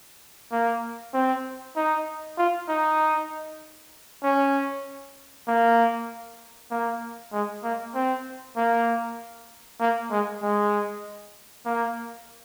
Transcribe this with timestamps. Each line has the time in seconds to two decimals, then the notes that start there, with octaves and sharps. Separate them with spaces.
0.52 A#3
1.14 C4
1.76 D#4
2.38 F4
2.69 D#4
4.23 C#4
5.48 A#3
6.71 A#3
7.32 G#3
7.64 A#3
7.95 C4
8.57 A#3
9.80 A#3
10.11 G#3
10.42 G#3
11.66 A#3